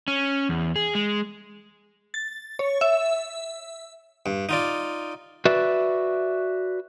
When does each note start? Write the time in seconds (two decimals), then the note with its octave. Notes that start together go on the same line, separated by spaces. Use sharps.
0.08 C#4
0.49 E2
0.76 G#4
0.95 G#3
2.14 A6
2.59 C#5
2.81 E5
4.26 G2
4.49 D#4 F4 D5
5.45 F#4 B4 D5 E5